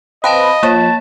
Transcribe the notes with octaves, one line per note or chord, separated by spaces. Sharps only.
C4 B4 D#5 F5 A5 B5
F3 A#3 C#5 A5